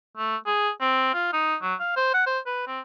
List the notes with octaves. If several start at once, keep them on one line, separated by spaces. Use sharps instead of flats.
A3
G#4
C4
F4
D#4
F#3
F5
C5
F#5
C5
B4
C4